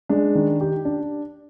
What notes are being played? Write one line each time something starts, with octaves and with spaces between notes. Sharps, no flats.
G#3 D4
D#3
G4
D4